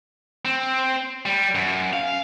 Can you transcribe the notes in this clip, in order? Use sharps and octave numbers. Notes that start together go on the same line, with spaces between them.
C4
G3
F#2
F5